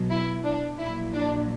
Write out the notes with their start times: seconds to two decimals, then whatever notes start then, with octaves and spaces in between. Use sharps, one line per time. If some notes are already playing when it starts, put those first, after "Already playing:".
Already playing: B1 B2 F#3
0.10 E4
0.45 D4
0.79 A#1 A#2 F#3 E4
1.14 D4